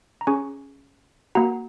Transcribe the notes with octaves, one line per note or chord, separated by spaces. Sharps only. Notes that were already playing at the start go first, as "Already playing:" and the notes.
A#5
C#4 G#4 G#5 C#6
A#3 F#4 F#5 A#5